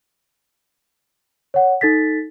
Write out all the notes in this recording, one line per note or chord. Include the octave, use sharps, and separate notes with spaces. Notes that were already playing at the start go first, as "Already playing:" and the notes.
C#5 F#5
D#4 A4 A6 B6